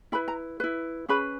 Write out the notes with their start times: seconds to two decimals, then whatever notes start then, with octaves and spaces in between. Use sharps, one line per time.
0.12 E4 B4 B5
0.28 A#5
0.60 E4 B4
1.08 C#4 G#4 B4 B5